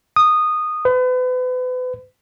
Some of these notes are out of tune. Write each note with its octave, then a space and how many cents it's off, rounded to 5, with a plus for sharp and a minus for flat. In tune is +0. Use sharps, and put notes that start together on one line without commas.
D#6 -15
B4 +35